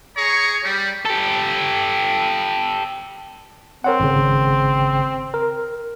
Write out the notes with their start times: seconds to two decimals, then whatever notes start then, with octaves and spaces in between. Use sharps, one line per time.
0.17 G#4 C#5 A#5 C#6
0.64 G3
1.05 G4 A4
3.84 C4 A#4 C#5 F#5
4.00 G#1 C#3
5.34 A#4